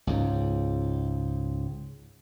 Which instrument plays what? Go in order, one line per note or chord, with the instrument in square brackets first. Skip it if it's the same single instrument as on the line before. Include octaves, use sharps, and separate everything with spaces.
[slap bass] C#2 G#2